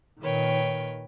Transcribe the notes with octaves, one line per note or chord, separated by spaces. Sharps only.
A#2 D#3 B4 C#5 G5